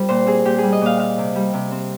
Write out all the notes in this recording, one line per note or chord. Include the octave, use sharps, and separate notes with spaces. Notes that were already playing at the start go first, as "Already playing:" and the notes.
Already playing: G3 C4 F4 A#4
A#2 C5
C4 G#4
A#2 G4
G3 G#4
D#5
A#2 F5
C4 F5
C3
G3
C3
C4